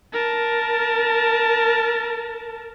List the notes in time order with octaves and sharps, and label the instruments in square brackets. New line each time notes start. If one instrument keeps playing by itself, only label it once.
[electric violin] A#4 A5